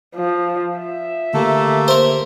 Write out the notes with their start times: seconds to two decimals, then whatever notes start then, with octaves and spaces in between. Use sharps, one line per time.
0.16 F3
0.79 E5
1.34 D3 A3 A#3 G4 A4
1.88 A#4 C5